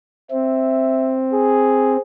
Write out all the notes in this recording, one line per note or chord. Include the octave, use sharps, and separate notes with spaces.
C4 E5
G#4